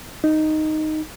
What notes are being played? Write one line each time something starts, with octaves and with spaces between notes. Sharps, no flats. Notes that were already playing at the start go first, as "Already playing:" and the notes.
D#4